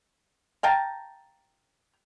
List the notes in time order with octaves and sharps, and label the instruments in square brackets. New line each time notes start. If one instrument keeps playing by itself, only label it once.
[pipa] F5 G5 A5 A#5